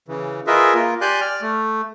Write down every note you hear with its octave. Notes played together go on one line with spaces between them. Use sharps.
C#3 E3
F4 G#4 A#4 B4 D#5 E5
A#3 F4 A#4
G4 D5 G#5 C6 F#6 G6
D5 F6
A3